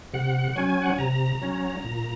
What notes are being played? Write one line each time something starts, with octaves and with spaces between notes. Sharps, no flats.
C3 F#5
F#3 C#4 G#5
F#5
G#5
C3 A#5
F#3 C#4
A#2